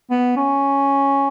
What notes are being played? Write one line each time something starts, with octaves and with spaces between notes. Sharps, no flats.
B3
C#4